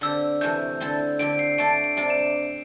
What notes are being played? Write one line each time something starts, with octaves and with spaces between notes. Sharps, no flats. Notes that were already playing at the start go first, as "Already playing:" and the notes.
D3 C4 G4 E6
C3 E3 A3 G6
D3 C4 E4 A4
D3 C4 G4 D7
C7
D3 A3 D4 A4 D7
D7
D7
C3 G3 D4 D7
E7